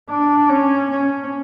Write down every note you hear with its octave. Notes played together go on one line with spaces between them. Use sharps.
D4
C#4
C#4